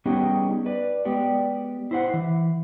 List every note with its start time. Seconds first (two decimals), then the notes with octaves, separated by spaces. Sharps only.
0.06 G3 B3 C#4 D#4 G4 G#4
0.66 B4 D5
1.05 G#3 B3 G4 D5
1.91 E4 C5 F#5
2.14 E3